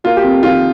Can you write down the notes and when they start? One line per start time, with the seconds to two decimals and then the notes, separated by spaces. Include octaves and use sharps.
0.04 A#3 F4
0.17 G4
0.23 F2
0.43 D#3 F4